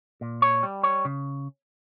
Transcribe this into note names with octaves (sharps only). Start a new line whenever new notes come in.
A#2
C#5
G3
C#5
C#3